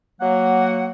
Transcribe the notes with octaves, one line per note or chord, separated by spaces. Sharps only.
F#3 A#3 F#5